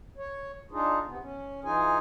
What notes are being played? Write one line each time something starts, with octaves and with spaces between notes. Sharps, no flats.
C#5
D4 D#4 F4 G#4
C3 B3
C#4
E3 D#4 F4 G#4 G#5